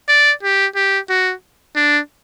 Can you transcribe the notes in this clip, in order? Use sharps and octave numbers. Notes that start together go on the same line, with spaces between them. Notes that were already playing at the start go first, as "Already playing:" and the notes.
D5
G4
G4
F#4
D4